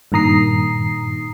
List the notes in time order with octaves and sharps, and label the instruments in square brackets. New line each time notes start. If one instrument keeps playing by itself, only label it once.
[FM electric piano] G2 A#2 D#3 A#5 D#6 C7